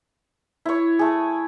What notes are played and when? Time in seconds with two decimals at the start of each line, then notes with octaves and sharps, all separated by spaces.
0.65 E4 C#5
0.99 A3 G#4